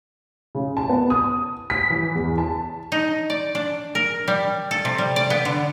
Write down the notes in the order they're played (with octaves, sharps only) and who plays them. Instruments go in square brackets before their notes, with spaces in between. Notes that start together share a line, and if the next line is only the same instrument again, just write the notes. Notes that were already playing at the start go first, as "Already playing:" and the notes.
[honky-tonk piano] C#3
A5
B3
D#6
B6
E3
E2
A5
[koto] D#4
D5
D4
A#4
G3
A4
C3
G3
D5
B3
D3